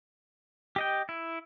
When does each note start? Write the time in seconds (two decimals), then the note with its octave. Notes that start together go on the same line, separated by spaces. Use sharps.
0.76 G4 D#5 G5
1.09 E4